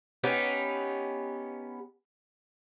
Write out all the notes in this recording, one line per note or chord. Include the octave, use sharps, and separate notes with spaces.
B3 C#4 D#4 G4